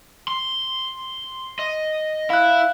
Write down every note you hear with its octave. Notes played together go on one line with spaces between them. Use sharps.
C6
D#5
E4 F5 F#6